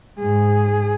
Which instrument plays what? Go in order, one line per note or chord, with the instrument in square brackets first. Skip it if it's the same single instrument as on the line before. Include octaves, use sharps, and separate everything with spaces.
[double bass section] G#2 [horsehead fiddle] G#4